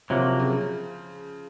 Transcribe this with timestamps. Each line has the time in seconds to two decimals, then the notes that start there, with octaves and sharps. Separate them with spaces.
0.10 C3 F3 F#3 A#3
0.39 C#3